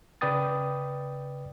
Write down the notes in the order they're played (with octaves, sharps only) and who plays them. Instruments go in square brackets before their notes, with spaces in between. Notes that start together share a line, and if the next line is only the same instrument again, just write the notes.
[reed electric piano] C#3 B4 D5 G5 D#6 A6